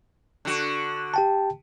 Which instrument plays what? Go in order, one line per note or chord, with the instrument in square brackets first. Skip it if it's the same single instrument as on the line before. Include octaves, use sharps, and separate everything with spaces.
[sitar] D3 F#4
[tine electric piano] G4 G5 A5